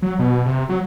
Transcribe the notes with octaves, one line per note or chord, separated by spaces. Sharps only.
F#3
B2
C3
F#3